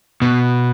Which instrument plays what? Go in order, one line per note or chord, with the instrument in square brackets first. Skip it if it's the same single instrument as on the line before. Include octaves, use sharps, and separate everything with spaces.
[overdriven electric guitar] B2